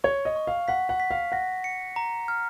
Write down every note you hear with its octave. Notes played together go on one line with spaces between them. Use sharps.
C#5 C#6
D#5
C#6
F5
F#5 B6
F#5
B6
F5
F#5 A#6
C#7
A#5
F6